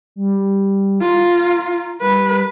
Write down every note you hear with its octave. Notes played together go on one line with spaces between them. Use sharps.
G3
F4 A#5
G3 B4